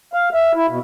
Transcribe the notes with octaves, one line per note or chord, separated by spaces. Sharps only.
F5
E5
E4
B2